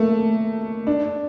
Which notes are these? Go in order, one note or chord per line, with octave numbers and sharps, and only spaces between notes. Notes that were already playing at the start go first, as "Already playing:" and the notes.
Already playing: A3 A#3
D4